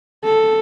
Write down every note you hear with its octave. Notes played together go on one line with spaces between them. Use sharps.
A4